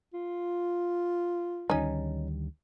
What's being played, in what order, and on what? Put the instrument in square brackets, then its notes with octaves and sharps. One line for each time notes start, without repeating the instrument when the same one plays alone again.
[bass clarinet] F4
[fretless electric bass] D2 D#3 G3 [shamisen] C#4 D#4